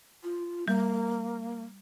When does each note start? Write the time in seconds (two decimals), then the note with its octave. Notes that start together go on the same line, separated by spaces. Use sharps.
0.24 F4
0.68 G3 A#3